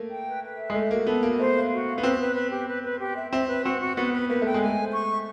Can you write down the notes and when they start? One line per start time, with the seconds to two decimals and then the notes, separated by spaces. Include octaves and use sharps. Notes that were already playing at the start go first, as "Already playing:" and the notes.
Already playing: A3 A#3
0.10 G5
0.27 B4
0.43 B4
0.58 E5
0.70 G#3
0.74 A3 A4
0.91 A#3 F#4
1.06 B3 A4
1.23 A#3 F#4
1.40 A3 C5
1.55 F5
1.71 F#4
1.88 F5
1.98 B3
2.03 C4 B4
2.20 B4
2.36 B4
2.52 G4
2.69 B4
2.84 B4
3.00 G4
3.16 E5
3.32 C4 E5
3.48 B4
3.64 C4 F#4
3.82 F#4
3.97 B3 F#4
4.14 B4
4.29 A#3 B4
4.42 A3 G5
4.54 G#3
4.62 A3 G#5
4.78 C5
4.94 C#6
5.10 E5